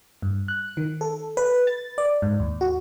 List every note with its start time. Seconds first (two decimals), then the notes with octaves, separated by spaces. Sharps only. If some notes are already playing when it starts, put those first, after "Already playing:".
0.22 G2
0.48 F#6
0.77 D#3
1.01 A4
1.37 B4
1.67 A6
1.98 D5
2.22 G#2
2.40 D#2
2.61 F#4